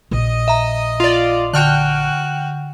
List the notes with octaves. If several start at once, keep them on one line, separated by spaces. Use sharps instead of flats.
A#1 D#5 D#6
E5 A#5
F4 D5 F7
D3 F#4 G5 F6 F#6